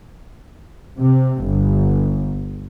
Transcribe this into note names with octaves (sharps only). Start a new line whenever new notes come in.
C3
G1